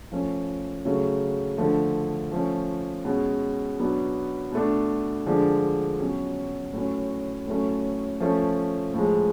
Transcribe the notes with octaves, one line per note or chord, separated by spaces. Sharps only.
F3 A3 C#4
C#3 F#3 A3
D3 F3 A3
F3 A3 C#4
B2 G#3 C#4
B2 F#3 B3 D4
B2 A3 D4
D3 F3 G#3 D4
B2 F#3 C#4
A2 F#3 C#4
A2 F#3 A3 C#4
F3 A3 C#4
A2 F3 G#3